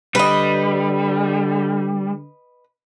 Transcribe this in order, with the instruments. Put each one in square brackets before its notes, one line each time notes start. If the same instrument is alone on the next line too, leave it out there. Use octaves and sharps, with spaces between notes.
[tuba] D3 [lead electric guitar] G3 [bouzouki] B4 D#5